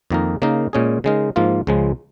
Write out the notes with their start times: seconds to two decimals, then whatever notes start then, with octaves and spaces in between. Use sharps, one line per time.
0.11 F2 D#3 A#3 D#4 A#4
0.42 C#3 A#3 D#4 A#4
0.73 A#2 G#3 C#4 G#4
1.04 C#3 G#3 D#4 A#4
1.36 G#2 F3 A#3 F4
1.67 C#2 C#3 F3 G#3